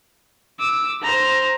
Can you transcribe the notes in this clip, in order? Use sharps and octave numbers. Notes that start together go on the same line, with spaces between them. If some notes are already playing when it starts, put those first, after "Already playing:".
D6 E6
C5 A#5